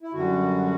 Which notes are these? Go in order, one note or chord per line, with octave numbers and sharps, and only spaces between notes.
E4
F#2 D3 G3 F#4